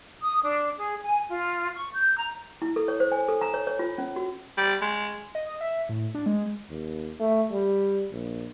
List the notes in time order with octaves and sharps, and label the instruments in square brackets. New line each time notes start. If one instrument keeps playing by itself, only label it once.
[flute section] D#6
D4
G#4
G#5
F4
C#6
G6
A#5
[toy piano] E4
A4
C#5
C5
G#5
A4
A#5
C#5
C#5
F4
C#4
F#4
[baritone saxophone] G3
G#3
[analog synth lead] D#5
E5
A2
D4
G#3
[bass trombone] D#2
A3
G3
A#1